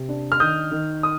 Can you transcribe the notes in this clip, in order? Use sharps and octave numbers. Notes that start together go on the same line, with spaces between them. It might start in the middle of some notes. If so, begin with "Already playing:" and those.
Already playing: C3
D4
F6
D#3 D#6 G6
D#3
D#6